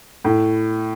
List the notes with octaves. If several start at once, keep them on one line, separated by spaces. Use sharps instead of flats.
A2